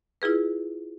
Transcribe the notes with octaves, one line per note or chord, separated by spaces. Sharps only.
E4 F4 G#4 B4